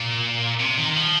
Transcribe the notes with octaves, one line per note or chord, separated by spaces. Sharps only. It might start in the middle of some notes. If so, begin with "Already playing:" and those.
Already playing: A#2
C3
D#3
F3